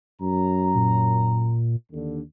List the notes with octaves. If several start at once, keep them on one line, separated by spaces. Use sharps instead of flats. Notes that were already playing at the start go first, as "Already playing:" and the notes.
F#2 A#5
A#2
D#2 D3